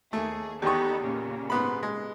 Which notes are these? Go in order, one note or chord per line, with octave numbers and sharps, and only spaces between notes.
D#2 A3 G#4
E2 B3 D#4 G4 A4 G5 C#6 D#6
A#2 C#3 A#3
G#2 B3 B5
G#3